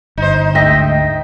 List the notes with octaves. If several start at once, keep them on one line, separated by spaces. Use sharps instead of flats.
G1 D#4 C5
D2 G#2 D#5 E5 G5